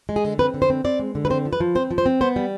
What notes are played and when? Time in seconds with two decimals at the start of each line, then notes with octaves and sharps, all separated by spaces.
0.09 G#3
0.16 G#4
0.25 D3
0.39 C4 B4
0.54 D3
0.62 C5
0.70 C4
0.84 C4 D5
0.99 G#3
1.15 D3
1.25 B4
1.30 C4 C5
1.45 F3
1.53 B4
1.60 F3
1.75 C4 C5
1.91 F3
1.98 C5
2.06 C4
2.21 B3 C5
2.36 G3